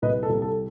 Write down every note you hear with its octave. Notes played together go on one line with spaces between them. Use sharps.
C2 B4 D#5
A4
C2
A4